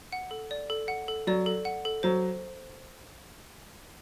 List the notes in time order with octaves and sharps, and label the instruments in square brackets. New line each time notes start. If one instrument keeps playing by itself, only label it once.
[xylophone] F#5
A4
D5
A4
F#5
A4
[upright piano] F#3 [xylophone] D5
[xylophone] A4
F#5
A4
[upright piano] F#3 [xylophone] C5